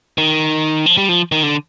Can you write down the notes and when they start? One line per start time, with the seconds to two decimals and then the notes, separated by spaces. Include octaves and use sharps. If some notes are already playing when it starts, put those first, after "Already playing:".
0.18 D#3
0.86 F3
0.97 G3
1.09 F3
1.32 D#3
1.43 D3